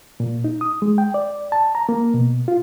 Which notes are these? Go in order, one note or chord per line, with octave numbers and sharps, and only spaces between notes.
A#2
D#4
D#6
G#3
G5
D5
A5
A#5
A#3
B2
F4